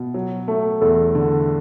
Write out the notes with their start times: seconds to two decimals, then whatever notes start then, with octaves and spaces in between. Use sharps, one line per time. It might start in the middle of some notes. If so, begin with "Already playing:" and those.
Already playing: B2
0.14 F#3
0.48 A3
0.81 E2 A4
1.15 D3